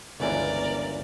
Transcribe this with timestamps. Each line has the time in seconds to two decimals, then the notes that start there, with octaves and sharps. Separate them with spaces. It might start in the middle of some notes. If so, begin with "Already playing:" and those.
0.20 G1 C#2 E3 A#4 D5